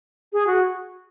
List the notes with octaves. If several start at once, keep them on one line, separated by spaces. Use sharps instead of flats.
G#4
F#4